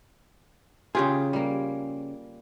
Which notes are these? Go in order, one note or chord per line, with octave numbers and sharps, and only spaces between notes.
C#3 F4 G4 G#4
G3 A#3